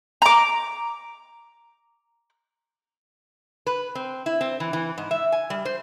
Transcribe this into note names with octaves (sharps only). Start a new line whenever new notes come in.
A#5 D6
B4
C4
E4
C4
E3
E3
G#2
E5
G#5
G3
C5